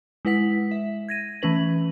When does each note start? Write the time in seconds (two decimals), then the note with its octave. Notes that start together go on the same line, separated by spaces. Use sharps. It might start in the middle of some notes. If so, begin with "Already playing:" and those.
0.25 G#3 E4 B4 F#5 B6
0.71 E5
1.09 G#6 A#6 D#7
1.42 E3 A3 C#4 B4 F#7